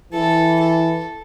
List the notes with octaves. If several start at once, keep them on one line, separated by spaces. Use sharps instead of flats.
E3 A4
A4